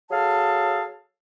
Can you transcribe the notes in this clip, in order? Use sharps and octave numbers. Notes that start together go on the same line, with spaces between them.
F#3 G#4 A4 F5 A5